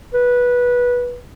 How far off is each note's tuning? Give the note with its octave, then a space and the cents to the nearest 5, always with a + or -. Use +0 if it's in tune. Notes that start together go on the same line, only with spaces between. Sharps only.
B4 -15